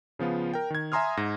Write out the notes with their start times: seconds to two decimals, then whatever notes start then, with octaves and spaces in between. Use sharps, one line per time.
0.19 C#3 F3 B3 F4
0.54 A#4 G5
0.70 D#3 G#6
0.92 E5 G#5 A#5 C6 D#6 F6
1.17 G#2 A#6